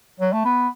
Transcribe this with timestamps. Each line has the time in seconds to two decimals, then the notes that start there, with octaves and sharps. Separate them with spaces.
0.20 F#3
0.33 A3
0.45 B3